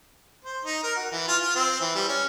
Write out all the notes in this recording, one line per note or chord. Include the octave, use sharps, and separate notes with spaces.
C5
D#4
A#4
F#4
E3
F4
F4
C4
E3
G3
C#4